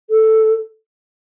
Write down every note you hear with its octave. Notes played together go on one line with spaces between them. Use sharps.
A4